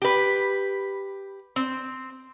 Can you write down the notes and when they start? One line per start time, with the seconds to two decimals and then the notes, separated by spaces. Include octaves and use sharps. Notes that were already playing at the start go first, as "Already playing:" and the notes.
0.02 G4 B4
1.56 C4